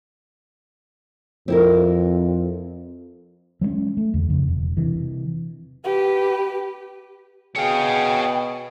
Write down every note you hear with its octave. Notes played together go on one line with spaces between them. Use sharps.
F2 C4 E4 A#4
F#3 G#3 B3 C#4
A3
E2 D3
F2 C#3
E1
C3 E3
G4 B4
B2 G#4 C#5 F5 G5